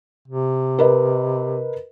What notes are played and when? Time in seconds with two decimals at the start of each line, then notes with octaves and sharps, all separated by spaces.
0.28 C3
0.79 A#4 B4 D#5